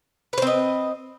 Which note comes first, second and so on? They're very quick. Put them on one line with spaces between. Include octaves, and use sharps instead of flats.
B4 C5 C4 D#5